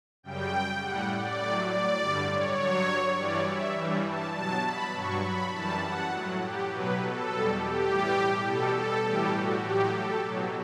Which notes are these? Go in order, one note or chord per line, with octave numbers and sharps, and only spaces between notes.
F#2 C#3 G3 G5
A2 G3 F#5
D5
A2 F#3
D5
G2 D3 G3
C#5
G2 F#3
G2 E3 G3 D5
E5
G2 E3 G3
A5
B2 F#3 A5
B5
G2 F#3 C#6
B5
F#2 E3 G3 A5
F#5
A2 F#3
G4
B2 F#3 B4
A4
E2 B2 G3
G4
A2 E3 G3
B2 G3 A4
A4
A2 E3 G3 G4
F#4
A2 F#3 G4
A4
B2 F#3